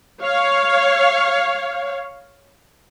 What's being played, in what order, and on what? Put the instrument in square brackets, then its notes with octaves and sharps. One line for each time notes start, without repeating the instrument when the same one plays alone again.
[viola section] C#5 F5